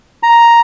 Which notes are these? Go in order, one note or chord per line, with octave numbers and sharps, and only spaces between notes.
A#5